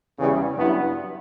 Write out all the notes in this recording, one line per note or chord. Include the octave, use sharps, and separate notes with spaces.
E2 C#3 E3 G3 C#4
G2 F#3 B3 E4